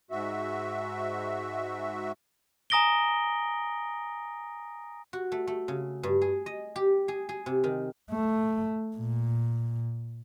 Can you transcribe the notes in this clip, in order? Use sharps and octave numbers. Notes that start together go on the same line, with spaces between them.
G#2 F#4 E5
G#5 A#5 D#6 A#6 D7 G7
F#4
A3
A3
C#3
G2
G#4
D#5
G4
G#4
G#4
C3
D#3
A3
A#2